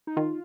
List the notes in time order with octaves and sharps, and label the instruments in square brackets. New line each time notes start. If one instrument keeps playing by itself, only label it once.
[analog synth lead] D#4
[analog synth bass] D#3 [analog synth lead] F4